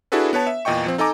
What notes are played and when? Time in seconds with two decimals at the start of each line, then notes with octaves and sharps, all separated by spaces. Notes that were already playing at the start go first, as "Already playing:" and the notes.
0.12 D4 E4 F#4 G#4 A4 B4
0.33 B3 B4 C#5 A5
0.47 E5
0.65 E2 A#2 D#5 G5 C#6
0.86 F3 C4
0.98 D#4 A4 D#5 G#5 A#5 D6